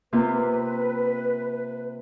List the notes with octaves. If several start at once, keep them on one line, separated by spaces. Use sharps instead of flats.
C3 A#3 F4 B4